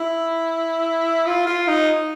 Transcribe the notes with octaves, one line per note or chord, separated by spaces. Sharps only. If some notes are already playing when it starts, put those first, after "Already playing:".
Already playing: E4
F4
F4
D#4